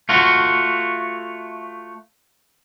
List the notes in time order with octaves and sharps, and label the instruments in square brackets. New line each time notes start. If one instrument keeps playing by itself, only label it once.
[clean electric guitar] A3 F4 F#4